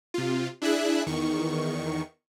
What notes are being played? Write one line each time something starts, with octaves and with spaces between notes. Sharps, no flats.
C3 F4
D4 E4 G#4 E5 F#6
E2 D#3 C#6